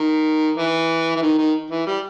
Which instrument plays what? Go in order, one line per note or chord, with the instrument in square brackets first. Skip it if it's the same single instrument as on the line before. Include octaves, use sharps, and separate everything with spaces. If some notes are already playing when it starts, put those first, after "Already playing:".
Already playing: [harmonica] D#3
E3
E3
D#3
D#3
E3
G3